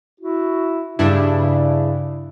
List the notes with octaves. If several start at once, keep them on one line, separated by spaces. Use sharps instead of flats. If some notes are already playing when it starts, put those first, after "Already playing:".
E4 F#4
G2 C#3 D4 E4